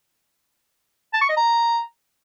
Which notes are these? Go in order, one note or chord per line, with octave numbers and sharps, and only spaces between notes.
A5
C#6
D#5
A#5